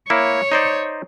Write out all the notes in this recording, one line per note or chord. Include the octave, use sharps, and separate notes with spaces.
A#3 E4 C#5
D#4 C5 D5